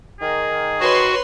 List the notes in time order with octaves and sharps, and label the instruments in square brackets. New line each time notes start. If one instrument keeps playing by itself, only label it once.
[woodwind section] D#3 [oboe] G#4
[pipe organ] F#4 [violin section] B4 C#5 C6